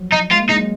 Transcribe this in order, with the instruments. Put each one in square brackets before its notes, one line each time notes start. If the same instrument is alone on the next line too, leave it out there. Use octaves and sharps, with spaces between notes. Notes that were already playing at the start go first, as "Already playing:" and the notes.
Already playing: [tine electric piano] F3 F#3
[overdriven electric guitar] D#4
[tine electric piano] G#3 [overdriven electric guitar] F4
[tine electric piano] A#3
[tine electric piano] G#3 [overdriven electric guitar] D#4
[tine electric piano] F#3